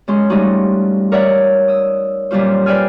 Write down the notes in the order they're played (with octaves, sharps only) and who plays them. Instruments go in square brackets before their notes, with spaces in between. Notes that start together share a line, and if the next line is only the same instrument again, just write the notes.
[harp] F#2 G#3 C#4 C6
F3 G3 A3 D#4 F#4
A#4 C#5 D5 E5 F#5
D#6 E6
F#2 A#2 F#3 G3 F4 C5
B4 C5 D5 G5 G#5 F6